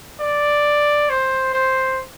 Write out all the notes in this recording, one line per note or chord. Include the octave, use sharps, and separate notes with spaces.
D5
C5
C5